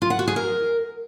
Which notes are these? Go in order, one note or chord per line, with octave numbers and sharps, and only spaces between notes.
F4
F#5
F#4
G#4
A#4